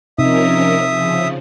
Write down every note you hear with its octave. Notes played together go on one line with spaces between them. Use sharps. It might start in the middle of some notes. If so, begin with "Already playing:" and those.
C3 F3 C#4 D#4 A#4 E5 D#6
C#3 F3